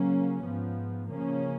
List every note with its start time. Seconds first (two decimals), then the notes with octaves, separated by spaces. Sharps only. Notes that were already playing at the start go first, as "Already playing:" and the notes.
Already playing: C#3 F#3 A#3 C#4
0.44 G#2 F3 B3
1.10 C#3 F3 A#3 C#4